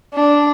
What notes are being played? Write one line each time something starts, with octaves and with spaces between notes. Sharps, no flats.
D4